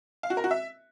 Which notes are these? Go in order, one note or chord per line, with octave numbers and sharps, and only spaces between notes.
F5
F#4
A#4
F#4
E5